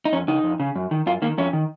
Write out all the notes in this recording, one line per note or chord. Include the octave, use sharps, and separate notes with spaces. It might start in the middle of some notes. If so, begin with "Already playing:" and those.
D#4
F2 C#4
C#3 D#4
F2
C#3
F#2
D#3
F#2 F4
D#3 A#3
F2 C#4
D#3